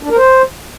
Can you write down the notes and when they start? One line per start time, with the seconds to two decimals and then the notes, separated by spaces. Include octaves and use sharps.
0.03 D4
0.10 A#4
0.17 C5